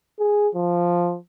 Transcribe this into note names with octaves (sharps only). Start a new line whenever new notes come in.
G#4
F3